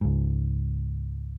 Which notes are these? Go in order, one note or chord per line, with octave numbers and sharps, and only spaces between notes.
C#2 G#2